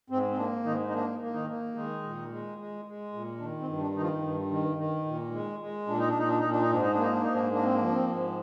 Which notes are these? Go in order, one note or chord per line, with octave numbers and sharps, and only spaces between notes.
G#2 C4
C4
A#3 D4
G#2 D#3 D#4
D#4
A#3 D4
A#3
D#3 D#4
A#3
D#3 G#3 D#4
A#2
G#3
G#3
G#3
A#2
D#3 D4
C4
G2
D4
D#3 D#4
F3 F4
G2
D#3
D#3
A#2
G#3
G#3
A#2 D4
D#4
D4
A#2 D#4
D4
A#2 D#4
D4
D#4
G#2 D4
D#4
D4
A#3
D#4
D4
G#2 D#4
D4
A#3 D4
C4
D4
F3
D4
C4
G#2